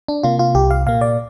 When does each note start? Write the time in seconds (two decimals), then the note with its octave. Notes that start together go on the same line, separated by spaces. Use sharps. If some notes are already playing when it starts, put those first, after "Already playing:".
0.08 D4
0.23 C3 A#3 F4
0.39 F4
0.55 C2 G4
0.71 F5
0.87 A#2 A#3 F5
1.01 D5